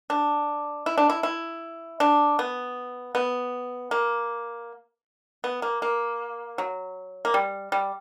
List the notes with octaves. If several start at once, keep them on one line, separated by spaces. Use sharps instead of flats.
D4
E4
D4
E4
E4
D4
B3
B3
A#3
B3
A#3
A#3
F#3
A#3
G3
G3